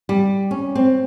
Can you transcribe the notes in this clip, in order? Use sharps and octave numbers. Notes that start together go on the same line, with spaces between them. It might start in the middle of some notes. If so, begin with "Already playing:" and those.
G3
C#4
C4